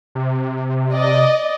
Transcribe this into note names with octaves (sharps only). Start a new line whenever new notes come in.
C3
D5 D#5